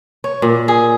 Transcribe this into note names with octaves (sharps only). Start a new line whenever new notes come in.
C#5
A#2
G#4